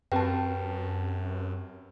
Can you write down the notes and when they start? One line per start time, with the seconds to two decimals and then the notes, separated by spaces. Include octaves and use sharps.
0.12 F#2 C4 G4 B4 G5 A5